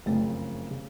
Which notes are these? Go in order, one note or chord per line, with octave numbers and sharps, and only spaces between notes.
F#1 F2 C#3 A3
C#3